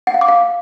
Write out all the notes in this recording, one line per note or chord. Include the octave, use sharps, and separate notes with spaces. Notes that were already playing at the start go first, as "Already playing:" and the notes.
F#5
F5
D6
F5